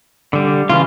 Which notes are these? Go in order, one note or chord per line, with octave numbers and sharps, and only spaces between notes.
D3 G3
C#3 E3 F4